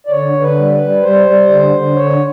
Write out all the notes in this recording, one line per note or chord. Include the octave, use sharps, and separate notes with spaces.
D5
D3 C#5
D3
B4
G3
B4
G3
G3 C5
G3
D3
D3
D3 C#5